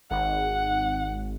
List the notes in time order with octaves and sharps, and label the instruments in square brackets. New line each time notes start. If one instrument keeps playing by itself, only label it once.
[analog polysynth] G#1 [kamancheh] F#5